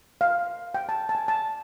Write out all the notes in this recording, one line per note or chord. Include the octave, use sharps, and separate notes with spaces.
F5
G5
A5
A5
G#5
A5